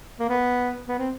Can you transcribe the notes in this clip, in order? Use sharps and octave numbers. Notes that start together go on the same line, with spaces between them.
A#3
B3
B3
C4